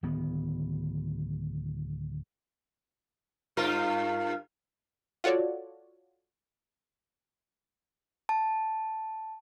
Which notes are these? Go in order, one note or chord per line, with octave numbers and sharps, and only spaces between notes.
D1 D#3 B3
G2 F4 A#4
F4 F#4 A4 C#5 D5
A5